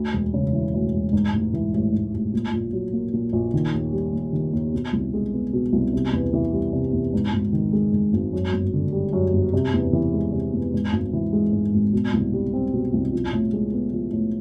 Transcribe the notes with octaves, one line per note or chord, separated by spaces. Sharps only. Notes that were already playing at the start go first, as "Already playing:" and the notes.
Already playing: D2
E1
C#3
E3
D2
E1
G#2
A1
E3
A1
G#2
A1
A#2
A#1
F#3
A#3
A#2
A#1
D#3
D#2
G3
D#2
D#3
D#2
B2
C2
G#3
B3
B2
C2
C3
E2
E3
G3
C3
E2
G#2
G#1
D#3
G#3
G#2
G#1
F#2
G1
D3
G3
F#2
G1
C3
E2
E3
G#3
C3
E2
G#2
G#1
E3
G#3
G#2
G#1
B2
C2
G3
C4
B2
C2
F3
A2
G#3
B3
F3
A2